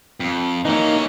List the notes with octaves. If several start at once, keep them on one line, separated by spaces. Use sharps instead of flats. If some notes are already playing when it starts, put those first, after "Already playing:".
F2
E3 A#3 C#4 D#4